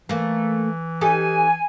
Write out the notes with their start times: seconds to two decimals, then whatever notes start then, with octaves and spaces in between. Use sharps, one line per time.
0.09 E3 A3 A#3
1.01 D#4 G4 A4 G#5